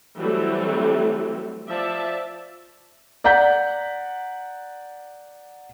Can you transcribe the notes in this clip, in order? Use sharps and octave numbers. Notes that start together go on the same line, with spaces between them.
E3 F#3 G3 A3 C4
F3 D5 E5 A5
D5 F#5 A#5 G6 B6